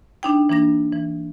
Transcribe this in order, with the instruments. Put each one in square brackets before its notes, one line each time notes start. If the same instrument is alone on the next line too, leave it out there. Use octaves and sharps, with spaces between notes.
[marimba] D4 D#4 G5
E3 A#3 D4 A#6
E3